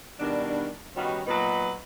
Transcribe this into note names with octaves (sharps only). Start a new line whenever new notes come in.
B2 D#3 G3 D4
D#3 G3 B3 C#4 D#4 F#4
A#2 F#3 B3 D#4 B4